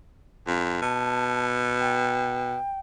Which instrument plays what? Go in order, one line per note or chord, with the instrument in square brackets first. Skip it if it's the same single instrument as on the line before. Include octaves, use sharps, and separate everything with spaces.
[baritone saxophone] F2
[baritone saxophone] B2 [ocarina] A5
[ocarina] G5